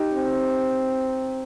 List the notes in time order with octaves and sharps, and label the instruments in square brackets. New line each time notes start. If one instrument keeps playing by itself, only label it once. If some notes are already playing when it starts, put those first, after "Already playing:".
Already playing: [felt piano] D#4 G4
[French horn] C4